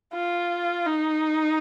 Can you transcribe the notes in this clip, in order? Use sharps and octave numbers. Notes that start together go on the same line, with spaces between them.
F4
D#4